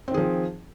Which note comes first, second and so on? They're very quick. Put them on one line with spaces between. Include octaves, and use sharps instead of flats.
C4 D#3 G#4 F3